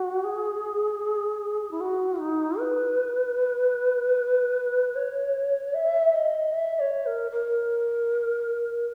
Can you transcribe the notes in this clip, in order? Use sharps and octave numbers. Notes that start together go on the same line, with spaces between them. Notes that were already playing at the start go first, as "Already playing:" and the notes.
Already playing: F#4
G#4
E4
F#4
D#4
B4
C#5
E5
D#5
E5
C#5
A#4
A#4